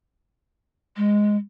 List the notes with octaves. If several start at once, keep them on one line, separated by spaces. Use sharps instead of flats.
G#3